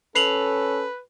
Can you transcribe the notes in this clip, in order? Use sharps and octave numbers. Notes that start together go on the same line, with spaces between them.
C#4 A4 B4 C7 F7 F#7